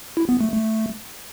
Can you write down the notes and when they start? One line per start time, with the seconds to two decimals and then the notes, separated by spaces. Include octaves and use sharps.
0.17 E4
0.29 B3
0.41 A3
0.52 A3